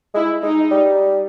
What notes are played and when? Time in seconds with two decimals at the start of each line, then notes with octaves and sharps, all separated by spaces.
0.14 G#3 E4
0.43 G#3 D#4
0.71 G3